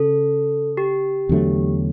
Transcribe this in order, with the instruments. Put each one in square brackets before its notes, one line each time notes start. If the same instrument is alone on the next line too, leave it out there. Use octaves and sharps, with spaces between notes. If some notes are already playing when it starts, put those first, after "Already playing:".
Already playing: [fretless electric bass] C#3 [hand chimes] A4
[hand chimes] G4
[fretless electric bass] E2 D3 F#3 A3